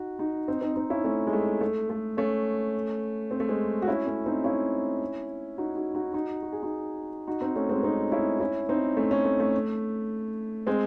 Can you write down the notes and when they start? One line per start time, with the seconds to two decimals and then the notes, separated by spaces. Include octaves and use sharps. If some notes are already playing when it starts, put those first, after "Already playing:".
Already playing: D#4 F#4
0.19 D#4 F#4
0.48 C4 D#4
0.62 C4 D#4
0.76 C4 D#4
0.90 C#4 E4
1.04 A3 C#4
1.27 G#3
1.33 A3
1.61 A3
1.90 A3
2.17 A3 C#4
3.31 C4
3.40 A3
3.49 G#3 C4
3.82 F#4
3.88 C#4 E4
4.06 A3 C#4
4.26 C4 D#4
4.44 C#4 E4
5.58 D#4 F#4
5.76 D#4 F#4
5.95 D#4 F#4
6.13 D#4 F#4
6.43 F#4
6.53 G#4
6.63 D#4 F#4
7.27 D#4 F#4
7.41 C4 D#4
7.56 A3 C#4
7.69 G#3 C4
7.83 C4 D#4
8.12 C#4 E4
8.40 C#4 E4
8.69 C4 D#4
8.97 A3 C#4
9.11 A3 C#4
9.25 A3
9.40 A3
10.67 G#3 C4